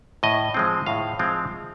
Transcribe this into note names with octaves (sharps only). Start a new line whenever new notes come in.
A2 D#5
F3 G#3 C4
A2 F5
F3 G#3 C4